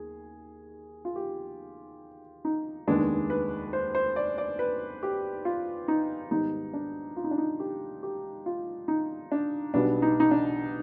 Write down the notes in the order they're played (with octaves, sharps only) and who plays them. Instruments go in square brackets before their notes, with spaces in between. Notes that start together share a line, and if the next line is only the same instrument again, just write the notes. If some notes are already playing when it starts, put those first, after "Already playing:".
Already playing: [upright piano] D#2 D#3 G#4
F4
G4
D#4
F1 D#2 D#3 G#3 B3 D4
B4
C5
C5
D5
D5
B4
G4
F4
D#4
G#1 G#2 D#3 G3 B3 D#4
D4
F4
D#4
D4
D#4
G4
G4
F4
D#4
D4
B1 B2 G3 B3 D4
D#4
D#4
D4